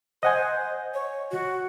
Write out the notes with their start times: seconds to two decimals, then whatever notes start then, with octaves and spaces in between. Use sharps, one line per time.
0.23 C5 D#5 F#5 G#5
0.94 C#5
1.31 F#4